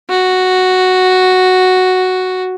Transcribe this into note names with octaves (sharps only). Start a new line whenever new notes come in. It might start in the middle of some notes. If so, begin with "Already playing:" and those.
F#4